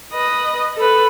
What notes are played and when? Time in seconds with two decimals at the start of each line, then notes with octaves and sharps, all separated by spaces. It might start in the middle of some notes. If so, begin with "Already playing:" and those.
0.13 B4 D#5
0.76 A4 B4